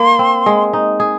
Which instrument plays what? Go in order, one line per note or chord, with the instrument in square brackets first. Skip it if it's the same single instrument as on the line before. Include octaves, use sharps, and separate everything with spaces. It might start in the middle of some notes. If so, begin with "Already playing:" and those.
Already playing: [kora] A#3 [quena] C6
[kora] C4
G#3
D#4
G#4